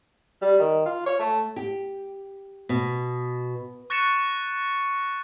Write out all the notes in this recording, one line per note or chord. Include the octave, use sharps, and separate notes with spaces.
G3
D#3
F4
C#5
A3
G4
B2
C#6 F#6 A6 A#6 C#7 E7